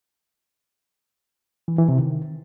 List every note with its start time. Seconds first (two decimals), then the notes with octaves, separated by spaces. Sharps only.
1.68 E3
1.78 E3
1.88 C3
1.99 D#3